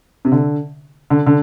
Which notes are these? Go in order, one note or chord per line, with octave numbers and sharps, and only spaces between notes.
C3
D3
D3
D3